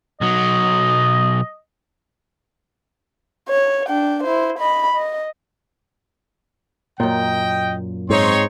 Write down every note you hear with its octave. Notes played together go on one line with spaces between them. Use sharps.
B1 F#3 D#5
C#5
D4 G5
E4 C5
D#5 B5
D#5
F#2 A#2 D#5 G5
G#2 C4 D#4 C#5 C6